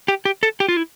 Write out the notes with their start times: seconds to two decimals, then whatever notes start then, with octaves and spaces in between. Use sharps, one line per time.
0.08 G4
0.25 G4
0.43 A4
0.60 G4
0.68 F4
0.77 E4